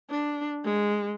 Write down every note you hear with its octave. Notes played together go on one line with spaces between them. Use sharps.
D4
G#3